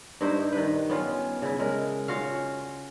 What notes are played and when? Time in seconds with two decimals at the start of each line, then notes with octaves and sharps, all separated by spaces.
0.21 G2 D#4 E4 C5
0.52 D#3 B4
0.89 B3 C#4 F4
1.42 C#3 E4
1.59 G#3 A#4
2.08 C#4 F4 F#4 F5